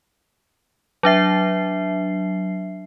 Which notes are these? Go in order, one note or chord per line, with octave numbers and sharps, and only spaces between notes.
F#3 D4 E5 C7